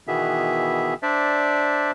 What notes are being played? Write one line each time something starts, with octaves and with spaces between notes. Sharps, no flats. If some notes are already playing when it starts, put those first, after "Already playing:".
B2 D#3 E3 B3 G#4 E5
D4 C5 D5 E5